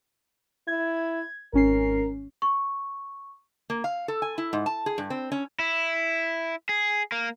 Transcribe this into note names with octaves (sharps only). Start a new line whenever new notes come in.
E4 G#6
G#1 C#4 A#4 C7
C#6
A#3
F5
A4
G#5
E4
G#2
A5
G#4
G2
C4
C#4
E4
G#4
A#3